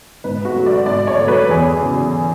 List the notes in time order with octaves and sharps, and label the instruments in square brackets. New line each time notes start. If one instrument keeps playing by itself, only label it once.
[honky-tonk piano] G#2 B4
F#4
F#3 A3
D5
G#2 D5
C#5
F#3 A3
B4
E2 G#4
C#3 F#3